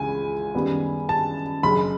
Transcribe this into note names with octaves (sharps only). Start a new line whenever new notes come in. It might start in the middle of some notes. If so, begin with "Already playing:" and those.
Already playing: C#2 C#3 E3 G#5
F#2 D#3 G3 B3
A5
F#1 F#2 C#3 B5